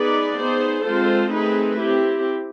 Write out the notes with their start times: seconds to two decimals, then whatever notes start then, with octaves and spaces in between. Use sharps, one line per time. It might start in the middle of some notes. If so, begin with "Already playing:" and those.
Already playing: B3 D#4 G#4 B4 D5
0.37 B3 D#4 G#4 C5
0.83 G#3 C4 F4 A4 C5
1.30 A3 C4 D#4 G#4 B4
1.77 C4 E4 G4